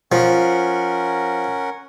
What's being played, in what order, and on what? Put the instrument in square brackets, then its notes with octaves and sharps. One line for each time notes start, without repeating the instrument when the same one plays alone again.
[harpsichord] F3 [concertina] C#4 A#4 F#5